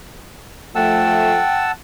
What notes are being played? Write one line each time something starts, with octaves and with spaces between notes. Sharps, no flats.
F3 A3 F#5 G5 A5 E6